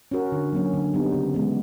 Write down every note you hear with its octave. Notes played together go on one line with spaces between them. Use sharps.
C#4 F#4 A#4
D3
F#3 A#3 C#4
D3
G3 B3 D#4
C#3
E3 G#3 B3